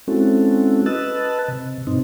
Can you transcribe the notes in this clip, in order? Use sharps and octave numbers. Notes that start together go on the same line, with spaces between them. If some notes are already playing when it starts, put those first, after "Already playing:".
G#3 C4 C#4 E4 F#4 A4
B4 D#5 A5 E6 F#6 A6
C3
G2 B2 C4 D#4